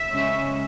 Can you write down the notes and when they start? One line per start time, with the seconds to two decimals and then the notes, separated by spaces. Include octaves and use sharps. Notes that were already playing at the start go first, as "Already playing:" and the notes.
Already playing: E5
0.13 C#3 G#3 C#4